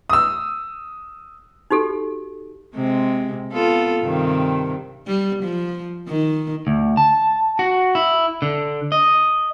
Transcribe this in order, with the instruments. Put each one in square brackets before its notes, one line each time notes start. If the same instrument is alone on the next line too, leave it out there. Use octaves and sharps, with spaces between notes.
[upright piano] D#6 E6
[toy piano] D#4 F#4 G4 A4
[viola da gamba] C3 G#3
B3 F4 A4
G2 C3 D#3
G3
F3
D#3
[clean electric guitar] D2
A5
F#4
E4
D3
D#5